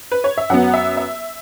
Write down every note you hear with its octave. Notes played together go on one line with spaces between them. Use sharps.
B4
C#5
E5
F#2 F#3 B3 F#5
E5
E5